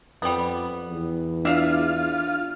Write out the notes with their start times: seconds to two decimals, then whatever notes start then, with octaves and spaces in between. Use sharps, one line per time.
0.22 F2 G3 B3
0.91 E2
1.45 D4 F4 E5 F5